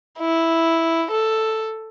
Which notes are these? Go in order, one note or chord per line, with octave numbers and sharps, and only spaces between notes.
E4
A4